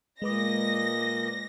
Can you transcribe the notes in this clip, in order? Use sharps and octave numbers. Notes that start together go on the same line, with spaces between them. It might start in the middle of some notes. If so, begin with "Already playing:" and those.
A#2 G#3 B4 D#5 D6 A#6